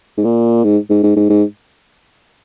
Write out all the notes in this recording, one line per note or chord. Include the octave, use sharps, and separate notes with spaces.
G#2
A#2
G#2
G#2
G#2
G#2
G#2